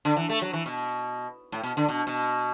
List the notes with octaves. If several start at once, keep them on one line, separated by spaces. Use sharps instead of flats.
D3
E3
A3
F#3
E3
B2
A2
B2
D3
B2
B2